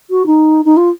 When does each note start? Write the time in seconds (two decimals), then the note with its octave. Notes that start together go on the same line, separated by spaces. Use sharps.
0.11 F#4
0.26 D#4
0.65 D#4
0.77 F4